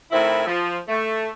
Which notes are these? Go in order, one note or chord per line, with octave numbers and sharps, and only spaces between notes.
A2 D#3 C4 E4
F3
A3